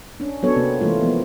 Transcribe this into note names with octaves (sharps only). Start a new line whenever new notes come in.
C#4 D4
F#3 B3 D4 A4 C#5
C3 A#3 C4
E3 G#3 A3 F4
F3 A#3 B3